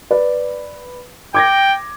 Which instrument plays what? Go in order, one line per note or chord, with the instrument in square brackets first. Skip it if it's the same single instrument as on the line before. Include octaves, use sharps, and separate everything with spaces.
[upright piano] B4 D5
[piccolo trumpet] G5 [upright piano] D6 G#6 A#6